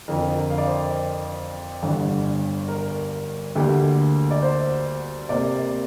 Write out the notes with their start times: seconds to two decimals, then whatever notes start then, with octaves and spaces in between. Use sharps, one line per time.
0.08 F2 D3 F3 A#4
0.37 A#4
0.50 F5
0.58 D5
0.66 C5
1.82 G1 G2 D3
2.68 A#4
3.55 D2 D3 A#3 G4
4.31 D5
4.42 C5
5.29 C3 A#3 D5